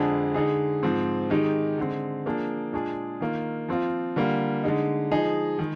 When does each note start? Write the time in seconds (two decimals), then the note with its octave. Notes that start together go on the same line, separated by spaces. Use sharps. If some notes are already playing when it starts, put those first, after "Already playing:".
Already playing: F2 D3 G#3 D4 G#4
0.34 D3 G#3 D#4 G#4
0.83 G#2 F3 C4
1.30 D#3 G#3 D#4 G4
1.78 D3 G#3 C4
2.26 F3 A#3 D4 G#4
2.73 A#2 G#3 D4 G#4
3.21 D#3 A#3 F4
3.68 F3 C4 F4
4.16 D3 G3 A#3 F4
4.64 D3 G#3 D#4
5.11 F3 G#3 D#4 G#4
5.59 D#3 G#3